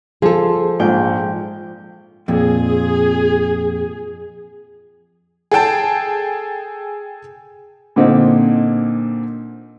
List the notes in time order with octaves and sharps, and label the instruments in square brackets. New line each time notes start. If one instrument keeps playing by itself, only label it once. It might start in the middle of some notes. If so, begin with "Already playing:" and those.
[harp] F3 [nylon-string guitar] G#4 A4
[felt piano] A#1 G#2 [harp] G5
[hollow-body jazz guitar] F2 A#2 [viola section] G#4
[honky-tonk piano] G#4 A4 G5 A5
[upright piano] A#2 D3 C4 D#4